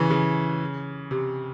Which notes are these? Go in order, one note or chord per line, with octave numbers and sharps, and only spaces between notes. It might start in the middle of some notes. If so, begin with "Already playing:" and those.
Already playing: C#3 E3
C#3
C3